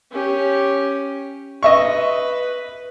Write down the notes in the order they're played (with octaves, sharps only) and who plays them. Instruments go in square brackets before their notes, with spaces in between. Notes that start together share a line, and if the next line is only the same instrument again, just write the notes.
[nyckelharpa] C#4 G4
[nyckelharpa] B4 [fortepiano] D#5 E5 C#6